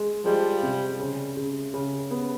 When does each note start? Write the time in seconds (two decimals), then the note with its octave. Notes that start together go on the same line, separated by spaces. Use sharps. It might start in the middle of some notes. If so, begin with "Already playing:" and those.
Already playing: G#3
0.25 F3 G3 G#3
0.63 C3
1.00 C#3
1.37 C#3
1.74 C#3
2.11 B3